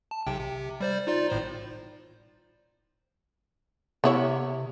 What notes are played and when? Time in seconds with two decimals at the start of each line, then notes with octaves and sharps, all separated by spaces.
0.11 A5
0.27 B1 C3 G5
0.40 C3
0.80 G3 C5 D5
1.07 D#4 F4 D5
1.30 G#1 A2 C5
4.04 C3 B3 E4 C#5